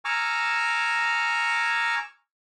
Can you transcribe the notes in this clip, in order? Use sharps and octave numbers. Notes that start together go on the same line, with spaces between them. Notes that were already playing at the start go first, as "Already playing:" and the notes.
G#5 A#5 C#6 D6 E6 F6